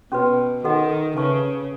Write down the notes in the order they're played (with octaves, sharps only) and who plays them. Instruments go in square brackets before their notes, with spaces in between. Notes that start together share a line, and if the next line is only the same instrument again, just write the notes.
[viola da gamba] B2 [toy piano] C#4 F#4 B4
[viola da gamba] D#3 [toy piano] F#4 A4 D#5 F#5
[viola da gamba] C#3 [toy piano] B4 E5 A5 C#6